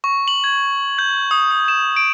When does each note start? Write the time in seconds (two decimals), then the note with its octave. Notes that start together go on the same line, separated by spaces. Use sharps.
0.04 C#6
0.28 F#7
0.44 G#6
0.99 G6
1.31 D#6
1.51 D#6
1.68 E7
1.96 D7